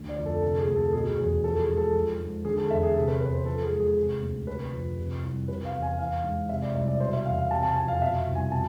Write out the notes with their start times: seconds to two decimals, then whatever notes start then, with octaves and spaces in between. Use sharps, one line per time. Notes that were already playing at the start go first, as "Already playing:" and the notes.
Already playing: D2 D3
0.09 D5
0.17 F2
0.26 A4
0.42 C3 A4
0.59 G#4
0.68 D2
0.76 A4
0.93 B2 G#4
1.18 E2 G#4
1.44 F3 A4
1.60 G#4
1.69 G#2
1.77 A4
1.94 F3
2.19 G#2
2.45 D3 G#4
2.57 A4
2.70 E2 E5
2.83 G#4
2.95 C3 A4
3.08 B4
3.21 E2 B4
3.33 C5
3.46 F3 A4
3.63 G#4
3.72 G#2
3.80 G#4
3.96 C3
4.22 D2
4.47 C3 B4
4.73 F2
4.97 C3
5.23 C2
5.48 C3 B4
5.65 F5
5.73 E2
5.82 G#5
5.99 E3 F5
6.24 G#2
6.49 C3 E5
6.62 D5
6.75 C2 E5
6.88 D5
7.00 B2 C5
7.13 E5
7.25 E2 F5
7.38 F5
7.51 C3 A5
7.63 A5
7.76 F2 G#5
7.88 F5
8.01 B2 E5
8.27 C2
8.35 G#5
8.52 B2 A5